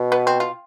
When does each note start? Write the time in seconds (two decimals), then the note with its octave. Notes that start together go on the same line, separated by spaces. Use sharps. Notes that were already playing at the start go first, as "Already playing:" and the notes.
Already playing: B2
0.12 B3
0.27 C4
0.40 F4